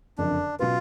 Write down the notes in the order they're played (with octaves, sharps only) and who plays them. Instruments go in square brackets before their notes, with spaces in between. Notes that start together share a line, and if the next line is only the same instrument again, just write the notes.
[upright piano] F#1 F2 D3 [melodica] D4
[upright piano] B2 F#3 C#4 F#4 B4 [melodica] F4